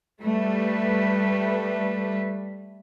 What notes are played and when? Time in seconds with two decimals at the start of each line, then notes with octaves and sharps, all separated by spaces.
0.21 G3 A3 B4